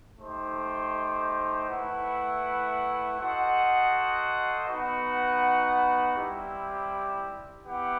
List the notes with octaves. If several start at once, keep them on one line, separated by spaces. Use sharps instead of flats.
A3 D#4 G4 C5
A3 E4 B4 F#5
F#4 A4 C5 D#5 F#5
B3 D#4 F#4 B4 F#5
G3 C4 E4 G4
B3 E4 G4 B4 F#5